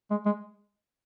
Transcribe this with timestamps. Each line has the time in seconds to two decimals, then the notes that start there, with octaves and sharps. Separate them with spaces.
0.11 G#3
0.26 G#3